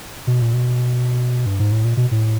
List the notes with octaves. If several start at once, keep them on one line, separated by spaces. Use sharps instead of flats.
B2
A#2
B2
G2
G#2
A2
A#2
B2
A2